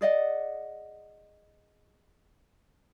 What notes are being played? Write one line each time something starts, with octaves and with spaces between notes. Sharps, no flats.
G#4 D5 D#5 F#5